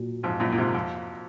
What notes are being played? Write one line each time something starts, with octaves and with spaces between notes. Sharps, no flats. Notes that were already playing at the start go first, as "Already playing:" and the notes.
Already playing: A#2 F#3
F2 G#2
F#2 A#2
A#2
G#2 C3
F2